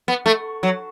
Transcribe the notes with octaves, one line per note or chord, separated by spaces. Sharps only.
B3
A3
F#3